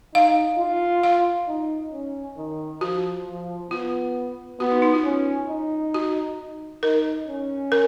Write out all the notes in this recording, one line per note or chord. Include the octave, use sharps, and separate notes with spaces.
D#4 F5
F4
F5
D#4
C#4
D#3
F3 F#4
F3
B3 F4
B3 F#4
D#4
D#4
F4
C#4
D#4
F#4
D#4 A#4
C#4
A#4